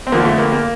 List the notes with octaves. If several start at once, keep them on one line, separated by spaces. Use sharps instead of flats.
C4
F2 D3 F3 A#3
A3
A#3
A#3